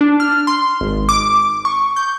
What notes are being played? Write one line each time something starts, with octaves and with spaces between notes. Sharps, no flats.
D4
F6
C6
G#1
D6
C#6
G6